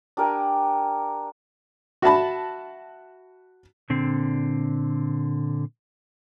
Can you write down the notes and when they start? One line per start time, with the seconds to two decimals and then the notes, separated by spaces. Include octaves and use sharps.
0.17 D4 G4 A#4 G#5
2.02 F#4 E5 A5 B5
3.90 A#2 D3 C4